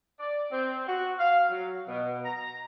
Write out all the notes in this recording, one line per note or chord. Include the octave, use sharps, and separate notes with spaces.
D5
C4
F#4
F5
F#3
B2
A#5